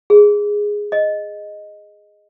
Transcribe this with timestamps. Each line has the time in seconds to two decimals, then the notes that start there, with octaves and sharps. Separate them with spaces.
0.10 G#4
0.92 D#5